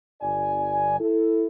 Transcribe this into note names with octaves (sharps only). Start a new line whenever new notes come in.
G1 D5 G#5
E4 A4